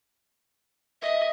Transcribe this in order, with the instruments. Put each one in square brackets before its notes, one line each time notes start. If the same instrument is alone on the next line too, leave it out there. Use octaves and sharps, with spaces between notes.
[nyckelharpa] D#5 [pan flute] E5